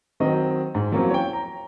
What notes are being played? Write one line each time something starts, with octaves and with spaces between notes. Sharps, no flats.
D#3 F#3 C4 D#5
G#2
F3 F#3 A#3 C4 C#4 E4
C#5 G5
A#5